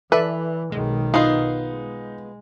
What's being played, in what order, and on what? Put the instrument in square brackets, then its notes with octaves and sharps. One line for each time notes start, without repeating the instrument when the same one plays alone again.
[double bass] E3 [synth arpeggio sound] A4 D5 E5 [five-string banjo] B4
[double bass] B1 D#3 [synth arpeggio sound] G#3
[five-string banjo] B3 F4 [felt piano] D#4 [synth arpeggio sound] C7
[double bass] G#3